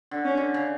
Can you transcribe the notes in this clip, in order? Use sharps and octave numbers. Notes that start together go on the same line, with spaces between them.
D3
C#4
D3
C#3